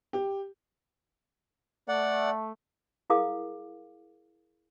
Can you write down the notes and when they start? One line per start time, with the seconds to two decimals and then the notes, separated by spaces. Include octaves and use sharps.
0.13 G4
1.89 A3 D5 F#5
3.10 E4 G#4 A#4 F5 D6 D#6